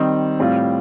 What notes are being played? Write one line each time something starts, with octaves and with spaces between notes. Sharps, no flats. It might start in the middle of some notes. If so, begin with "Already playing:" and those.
Already playing: D#3 G3 C4 D#4
A2 G3 C4 F4